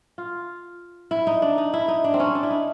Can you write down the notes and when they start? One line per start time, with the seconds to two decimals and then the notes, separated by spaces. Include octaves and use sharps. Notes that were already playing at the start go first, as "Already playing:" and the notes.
0.18 F4
1.11 E4
1.27 D#4
1.42 D4
1.58 D#4
1.73 E4
1.88 D#4
2.04 D4
2.14 C4
2.20 C#4
2.35 D4
2.43 E4
2.50 D#4